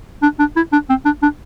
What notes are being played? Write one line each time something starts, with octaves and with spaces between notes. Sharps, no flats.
D4
D4
E4
D4
C4
D4
D4